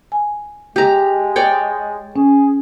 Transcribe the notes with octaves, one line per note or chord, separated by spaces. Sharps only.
G#5
G#3 G4 A#5
C#5 D5 G5
C#4 G#4